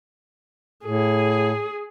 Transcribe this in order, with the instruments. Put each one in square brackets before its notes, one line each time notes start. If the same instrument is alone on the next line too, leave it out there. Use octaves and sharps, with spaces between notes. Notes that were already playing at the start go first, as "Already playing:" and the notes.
[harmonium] A2 [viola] G#4